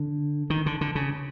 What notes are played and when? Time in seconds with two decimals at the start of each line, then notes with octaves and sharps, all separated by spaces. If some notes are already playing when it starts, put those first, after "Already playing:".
Already playing: D3
0.50 D#3
0.66 D3
0.81 D3
0.95 C#3